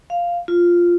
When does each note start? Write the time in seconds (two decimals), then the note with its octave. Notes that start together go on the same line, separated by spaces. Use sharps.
0.10 F5
0.48 F4